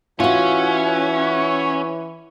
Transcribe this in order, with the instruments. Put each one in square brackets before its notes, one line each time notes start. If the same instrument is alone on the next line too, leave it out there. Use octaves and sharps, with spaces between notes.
[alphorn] E3 [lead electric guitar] C#4 [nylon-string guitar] F4 F#4 [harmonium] C#5 E5 F#5